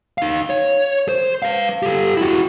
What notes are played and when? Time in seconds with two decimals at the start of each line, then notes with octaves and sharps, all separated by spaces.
0.18 D#4 F5
0.50 C#5
1.09 C5
1.42 B4 F5
1.83 G4 A4
2.17 E4 F#4